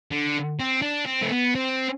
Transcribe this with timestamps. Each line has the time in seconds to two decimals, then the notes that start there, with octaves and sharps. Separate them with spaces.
0.11 D3
0.59 C4
0.82 D4
1.06 C4
1.22 A3
1.31 B3
1.55 C4